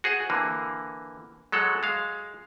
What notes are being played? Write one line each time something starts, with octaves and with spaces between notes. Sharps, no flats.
F#4 G#4 C5 F#5
D3 E3 A#3
F#3 G#3 A4 C#5 F#5
G#3 F5